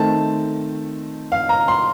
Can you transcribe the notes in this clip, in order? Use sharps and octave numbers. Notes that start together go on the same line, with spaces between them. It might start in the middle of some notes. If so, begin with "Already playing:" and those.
Already playing: D#3 A3 C4 A5
F5
A#5
C6